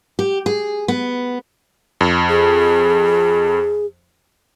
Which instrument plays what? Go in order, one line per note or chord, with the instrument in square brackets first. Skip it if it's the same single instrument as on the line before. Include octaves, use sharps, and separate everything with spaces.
[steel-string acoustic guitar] G4
G#4
B3
[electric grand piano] F2
[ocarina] G#4